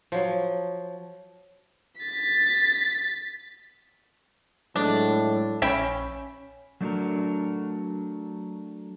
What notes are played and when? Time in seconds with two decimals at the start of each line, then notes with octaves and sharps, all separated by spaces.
0.12 F3 F#3
2.01 A6 B6
4.76 A2 F#3 G#3 D4
5.62 A#1 C#4 E5 G5 B5
6.81 F#3 A3 D4 E4 F#4 A#4